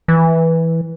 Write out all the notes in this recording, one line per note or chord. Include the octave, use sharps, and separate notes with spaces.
E3